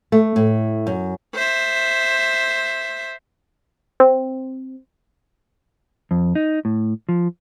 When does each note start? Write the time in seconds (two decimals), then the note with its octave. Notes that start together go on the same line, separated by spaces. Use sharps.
0.12 A3
0.36 A2
0.87 F#2
1.34 C5 E5
4.00 C4
6.11 F2
6.35 D#4
6.65 A2
7.09 F3